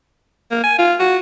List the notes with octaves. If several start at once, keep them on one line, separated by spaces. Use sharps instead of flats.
A#3
G#5
F4
F#4